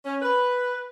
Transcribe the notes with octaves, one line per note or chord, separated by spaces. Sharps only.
C#4
B4